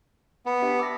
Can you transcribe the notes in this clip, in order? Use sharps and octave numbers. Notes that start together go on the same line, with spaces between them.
B3
D4 G4 E5
D6 E6 A#6